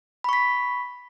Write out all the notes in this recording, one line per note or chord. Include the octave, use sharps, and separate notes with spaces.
B5 C#6 B6